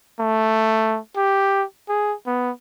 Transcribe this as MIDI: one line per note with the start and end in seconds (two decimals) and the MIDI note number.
0.20 0.98 57
1.17 1.64 67
1.89 2.14 68
2.27 2.51 59